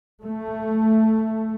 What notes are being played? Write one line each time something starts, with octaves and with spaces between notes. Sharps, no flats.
A3